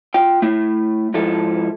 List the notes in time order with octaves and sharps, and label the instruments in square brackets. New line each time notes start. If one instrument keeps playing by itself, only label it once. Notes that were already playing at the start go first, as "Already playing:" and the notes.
[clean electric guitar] F4 G5
A3 E4
G#2 F3 E4 A4